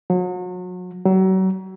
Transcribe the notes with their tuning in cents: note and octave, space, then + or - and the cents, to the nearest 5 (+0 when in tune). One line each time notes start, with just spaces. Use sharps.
F#3 -35
F#3 +35